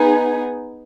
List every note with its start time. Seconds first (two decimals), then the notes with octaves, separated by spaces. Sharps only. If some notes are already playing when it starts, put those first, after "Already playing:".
Already playing: B3 D#4 G#4